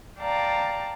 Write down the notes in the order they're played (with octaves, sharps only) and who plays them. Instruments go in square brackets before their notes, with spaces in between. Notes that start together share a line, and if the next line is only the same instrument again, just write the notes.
[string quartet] D5 F5 G5 A5 A#5